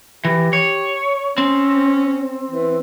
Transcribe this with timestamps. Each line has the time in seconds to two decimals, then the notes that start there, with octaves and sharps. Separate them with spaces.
0.25 E3 G4
0.53 C#5
1.38 C4 C#4
2.51 E3